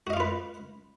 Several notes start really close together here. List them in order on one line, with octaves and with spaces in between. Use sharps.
F#4 D#5 F5 F4 B4